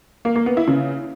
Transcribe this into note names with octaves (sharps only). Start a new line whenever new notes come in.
A#3
A#3
B3
E4
C#3